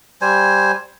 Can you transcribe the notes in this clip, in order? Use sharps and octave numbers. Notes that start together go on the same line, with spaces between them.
G3 C5 G#5